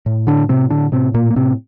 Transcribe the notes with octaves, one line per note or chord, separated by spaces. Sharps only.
A2
D3 D4
A2 C3 C4
D3 D4
A2 C3 C4
A#2 A#3
A#3
A2 C3 C4